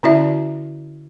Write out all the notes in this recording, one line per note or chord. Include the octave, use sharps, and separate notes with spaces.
D3 C#4 E4 F#4 D5 E5